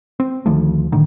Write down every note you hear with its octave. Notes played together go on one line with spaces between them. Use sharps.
C4
D2 D#3 F3 A3
A2 D3 D#3